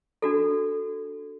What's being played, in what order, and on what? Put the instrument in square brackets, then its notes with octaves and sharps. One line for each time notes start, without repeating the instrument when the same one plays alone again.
[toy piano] D4 F#4 A4